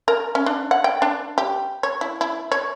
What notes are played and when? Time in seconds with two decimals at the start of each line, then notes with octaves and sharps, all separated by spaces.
0.08 A#4
0.35 C#4
0.46 D4
0.71 F#5
0.84 G5
1.02 D4
1.38 G4
1.83 C#5
2.01 E4
2.21 E4
2.52 C#5